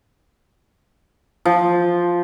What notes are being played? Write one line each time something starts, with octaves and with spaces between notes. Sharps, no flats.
F3